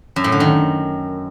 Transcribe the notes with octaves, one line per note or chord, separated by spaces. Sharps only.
F#2
A2
D3
D#3